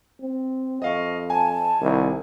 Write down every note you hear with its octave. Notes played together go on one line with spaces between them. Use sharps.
C4
F2 D#5 F5 C#6
G#5 A5
C2 D#3